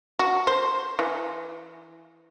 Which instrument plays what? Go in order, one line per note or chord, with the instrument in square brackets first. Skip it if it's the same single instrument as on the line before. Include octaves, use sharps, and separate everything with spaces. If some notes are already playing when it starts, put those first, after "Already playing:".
[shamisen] F#4
C5
E3